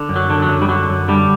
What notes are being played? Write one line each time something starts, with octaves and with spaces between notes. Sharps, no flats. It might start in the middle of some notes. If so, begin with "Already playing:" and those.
Already playing: D3
F#2
F#3
D3
F#3
F#2
G3
D3 F#3
F#2
D3 G3